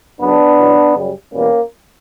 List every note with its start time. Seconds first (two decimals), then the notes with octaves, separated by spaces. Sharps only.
0.20 F#2 C#3 F#3 B3 D4
0.58 E2 B2 F#3
0.96 F#2 C#3 G3
1.33 E2 B2 G3 A#3 C#4